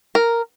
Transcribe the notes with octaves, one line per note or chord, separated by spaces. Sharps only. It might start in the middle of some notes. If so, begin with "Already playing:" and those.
A#4